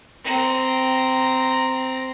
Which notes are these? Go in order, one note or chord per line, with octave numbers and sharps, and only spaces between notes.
C4 A#5